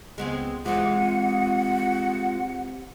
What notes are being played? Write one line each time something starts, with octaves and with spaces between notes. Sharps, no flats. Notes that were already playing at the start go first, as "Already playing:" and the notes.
C#2 G#3 B3 C4
C3 E3 G#3 F4 F#5